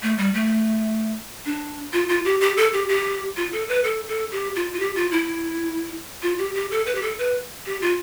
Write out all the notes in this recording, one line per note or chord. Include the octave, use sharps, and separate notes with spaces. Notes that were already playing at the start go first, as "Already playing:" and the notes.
A3
G3
A3
D4
F4
F4
G4
G4
A4
G4
G4
F4
A4
B4
A4
A4
G4
F4
F4
G4
F4
E4
F4
G4
G4
A4
B4
G4
A4
B4
G4
F4